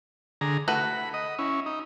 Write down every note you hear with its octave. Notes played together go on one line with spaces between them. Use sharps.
D3 G#4 A#5
A3 F#4 B4 B5
D#5
C#4 E4
D#4